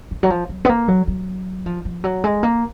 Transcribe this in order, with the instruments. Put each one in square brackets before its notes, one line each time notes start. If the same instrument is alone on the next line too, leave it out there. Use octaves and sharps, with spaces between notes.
[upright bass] D#3
F#3
F3
F#3
B3
A#3
F#3
F#3
F3
F3
F#3
G#3
A#3